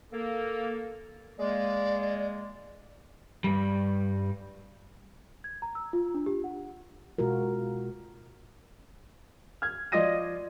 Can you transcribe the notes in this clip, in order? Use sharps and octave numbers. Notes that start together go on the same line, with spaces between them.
A#3 A4
G#3 A#3 D5
G2 G3
G#6
A#5
E6
F4
D4
G4
F#5
B2 G#3 F4 F#4 A#4
F6 G#6
F3 F4 D5 D#5 A#6 D#7